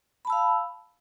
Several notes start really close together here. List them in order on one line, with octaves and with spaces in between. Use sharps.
B5 A5 E6 F5